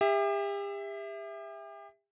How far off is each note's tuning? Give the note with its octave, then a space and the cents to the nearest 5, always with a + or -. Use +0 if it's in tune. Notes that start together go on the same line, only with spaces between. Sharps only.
G4 +40 E5 +0